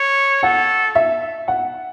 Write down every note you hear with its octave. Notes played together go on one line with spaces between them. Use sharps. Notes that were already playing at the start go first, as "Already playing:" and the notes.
Already playing: C#5
A4 F#5
E5
F#5